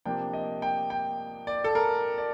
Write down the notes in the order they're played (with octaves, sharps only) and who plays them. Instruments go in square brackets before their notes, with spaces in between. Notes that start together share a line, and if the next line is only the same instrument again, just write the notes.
[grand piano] C3 F3 A#3 D4 G5
D#5
G5
G5
D5
A4
A#4
D5